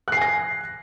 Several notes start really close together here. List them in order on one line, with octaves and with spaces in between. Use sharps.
F#6 C7 G#5 A#6